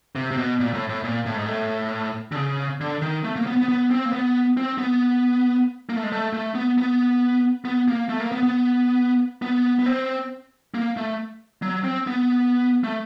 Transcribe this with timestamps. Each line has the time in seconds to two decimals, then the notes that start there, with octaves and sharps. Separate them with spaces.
0.16 C3
0.31 C3
0.37 B2
0.60 A#2
0.74 A2
0.89 A2
1.04 A#2
1.26 A2
1.36 G#2
1.46 A2
2.32 D3
2.36 C#3
2.81 D3
3.02 D#3
3.24 A3
3.36 A#3
3.47 B3
3.57 B3
3.69 B3
3.91 C4
4.06 A#3
4.13 B3
4.57 C4
4.78 B3
5.89 A#3
5.96 A3
6.04 G#3
6.12 A3
6.33 A3
6.55 B3
6.78 B3
7.65 B3
7.88 A#3
8.09 A3
8.20 A#3
8.32 B3
8.43 B3
9.42 B3
9.79 B3
9.86 C4
10.74 A#3
10.97 A3
11.62 F#3
11.84 C4
12.07 B3
12.84 A3